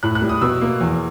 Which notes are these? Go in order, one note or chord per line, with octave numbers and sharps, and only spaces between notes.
A2 F#6
F#6
G3
D#6
B2 E6
A#3
E2